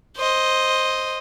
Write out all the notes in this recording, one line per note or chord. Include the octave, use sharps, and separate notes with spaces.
C5 D#5